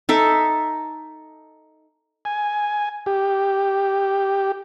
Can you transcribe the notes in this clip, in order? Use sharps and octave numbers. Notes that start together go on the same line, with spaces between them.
D#4 A4 E5
G#5
G4